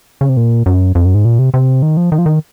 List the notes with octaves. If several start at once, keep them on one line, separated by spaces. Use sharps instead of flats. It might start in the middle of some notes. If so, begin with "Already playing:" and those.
C#3
C3
A#2
F#2
F2
F#2
G#2
A#2
C3
C3
D#3
F3
D#3
F3
D#3